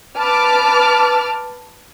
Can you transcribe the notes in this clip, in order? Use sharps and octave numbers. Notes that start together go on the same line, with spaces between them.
B4 A5 D6 F6